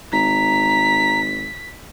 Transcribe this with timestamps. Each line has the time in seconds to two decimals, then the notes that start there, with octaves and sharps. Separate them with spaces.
0.13 G#1 A#5 B6